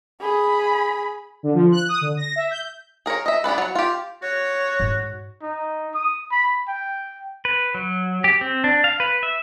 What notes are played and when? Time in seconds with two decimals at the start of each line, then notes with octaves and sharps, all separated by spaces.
0.20 G#4 B5
1.43 D3
1.54 F3
1.72 F#6
1.89 D#6
2.01 D3
2.17 A#6
2.36 E5
2.51 G6
3.06 G#4 A#4 B4 C#5
3.26 D#5 E5
3.44 G3 B3 D4 B4
3.58 F#3 C#5
3.75 F4 G4
4.23 F#4 C#5
4.80 G#2 D#4
5.42 D#4
5.94 D#6
6.31 B5
6.68 G5
7.45 B4
7.74 F#3
8.24 G4
8.41 C4
8.64 D4
8.84 F5
9.00 B4
9.23 E5